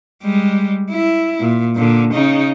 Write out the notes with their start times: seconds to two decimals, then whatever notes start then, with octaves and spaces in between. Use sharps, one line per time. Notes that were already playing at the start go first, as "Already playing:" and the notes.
0.23 G3 G#3
0.91 E4
1.40 A#2
1.76 A#2 D3
2.14 C#3 D#4